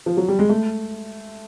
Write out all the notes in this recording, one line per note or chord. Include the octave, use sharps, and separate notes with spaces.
F3
F#3
G3
G#3
A3